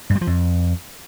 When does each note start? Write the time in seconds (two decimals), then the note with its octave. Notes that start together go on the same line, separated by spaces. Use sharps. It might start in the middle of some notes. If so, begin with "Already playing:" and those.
0.10 G2
0.16 G3
0.21 F3
0.27 F2